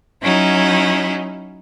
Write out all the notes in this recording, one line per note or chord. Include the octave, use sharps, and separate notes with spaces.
F#3 C#4 D#4 E4